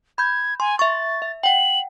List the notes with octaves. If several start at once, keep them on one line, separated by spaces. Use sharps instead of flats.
B5 G6 G#6
G#5 C6
E5 C#6 A6
E5
F#5 G5 F#7